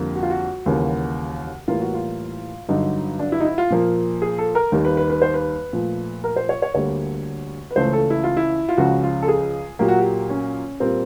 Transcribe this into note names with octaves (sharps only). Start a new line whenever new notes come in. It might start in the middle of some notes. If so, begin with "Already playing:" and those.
Already playing: F2 D3 G3 A#3
F#4
F4
F#4
D#2 C#3 E3 G3 A#3
A2 E3 G3 A#3 F4
F#4
F4
G2 D3 F#3 D#4
D4
E4
D#4
E4
F4
A#2 F3 A#3
G#4
A4
A#4
D#2 D#3 G3 A#3
B4
B4
B4
C5
B4
A#2 F3 A3
A#4
C5
C#5
C#5
D2 D3 G3 A#3 C#5
B4
C#2 C#3 E3 A3 C5
A4
E4
F4
E4
F4
C#2 C#3 F3 F#4
F4
A4
G#4
A#2 F#3 A#3 G4
F#4
G4
C#4
A#2 G3 A#3 C4